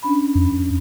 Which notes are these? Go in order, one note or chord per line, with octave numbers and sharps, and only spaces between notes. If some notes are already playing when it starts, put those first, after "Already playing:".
C#4 D4 B5
F2